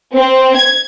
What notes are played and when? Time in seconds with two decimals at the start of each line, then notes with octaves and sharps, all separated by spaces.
0.14 C4
0.56 G#6